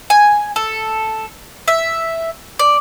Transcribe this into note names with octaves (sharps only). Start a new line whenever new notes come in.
G#5
A4
E5
D5